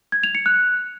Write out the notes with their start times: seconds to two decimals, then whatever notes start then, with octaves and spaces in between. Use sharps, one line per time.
0.12 G#6
0.23 F7
0.35 C#7
0.46 F#6